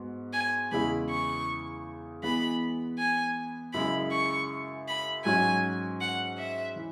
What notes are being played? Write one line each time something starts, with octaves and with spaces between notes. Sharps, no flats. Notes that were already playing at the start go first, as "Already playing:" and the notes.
Already playing: G#2 B3 F#4
G#5
E2 C#3 G#3 E4 B5
C#6
E3 G#3 B3 B5
G#5
F#2 C#3 G#3 E4 B5
C#6
B5
G#2 F#3 C#4 F#4 G#5
F#5
E5
E3